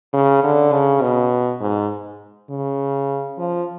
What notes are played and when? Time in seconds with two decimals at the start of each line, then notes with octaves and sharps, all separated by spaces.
0.13 C#3
0.44 D3
0.73 C#3
1.02 B2
1.61 G#2
2.50 C#3
3.38 F3